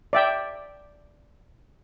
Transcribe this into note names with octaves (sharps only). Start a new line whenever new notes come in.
D5 E5 G5